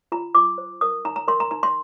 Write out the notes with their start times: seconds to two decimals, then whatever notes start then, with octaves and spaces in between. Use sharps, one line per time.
0.12 F4 A#5
0.35 F4 D6
0.58 C5
0.81 A#4 D#6
1.05 D#4 A#5
1.16 A#5
1.28 A#4 C6
1.40 A#5
1.51 D#4 A#5
1.63 C6